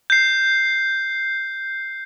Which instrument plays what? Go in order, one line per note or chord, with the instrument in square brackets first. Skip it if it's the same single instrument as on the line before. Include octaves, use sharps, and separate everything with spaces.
[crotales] G6 C7